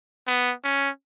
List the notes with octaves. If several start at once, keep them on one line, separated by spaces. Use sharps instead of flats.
B3
C#4